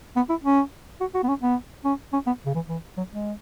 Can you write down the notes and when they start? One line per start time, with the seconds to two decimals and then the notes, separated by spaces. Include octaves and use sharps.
0.16 B3
0.29 E4
0.44 C#4
1.00 F#4
1.15 F#4
1.23 B3
1.29 C#4
1.42 B3
1.84 C#4
2.13 C#4
2.27 B3
2.46 C#3
2.55 E3
2.69 E3
2.97 F#3
3.11 G#3